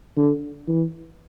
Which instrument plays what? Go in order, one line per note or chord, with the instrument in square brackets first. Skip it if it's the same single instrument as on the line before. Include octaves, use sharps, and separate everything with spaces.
[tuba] D3
E3